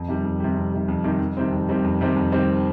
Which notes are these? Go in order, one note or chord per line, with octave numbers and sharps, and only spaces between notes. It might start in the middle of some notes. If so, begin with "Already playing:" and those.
Already playing: F2
C3 D#3 G3
F2
C3 D#3 G3
F2
C3 D#3 G3
F2
C3 D#3 G3
F2
C3 D#3 G3 C4
F2
C3 D#3 G3 C4
F2
C3 D#3 G3 C4
F2
C3 D#3 G3 C4